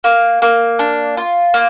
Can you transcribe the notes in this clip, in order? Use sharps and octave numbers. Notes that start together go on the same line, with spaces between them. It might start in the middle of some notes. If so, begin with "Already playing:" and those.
A#3
A#3
D4
F4
A#3